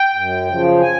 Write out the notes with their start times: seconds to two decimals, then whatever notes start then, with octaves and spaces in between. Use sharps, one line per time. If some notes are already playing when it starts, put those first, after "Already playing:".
Already playing: G5
0.15 F#2
0.48 C#3 F3
0.81 G#5